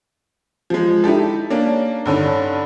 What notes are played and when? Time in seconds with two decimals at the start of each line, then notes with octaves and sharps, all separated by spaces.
0.70 F3 G#3
1.04 D#4 E4 G4 A4
1.50 A#3 C#4 D4
2.05 G2 D3 C#4 D#4